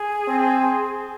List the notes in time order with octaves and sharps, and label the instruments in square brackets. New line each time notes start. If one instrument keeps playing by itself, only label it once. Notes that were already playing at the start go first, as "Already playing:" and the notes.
Already playing: [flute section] G#4
[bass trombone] C4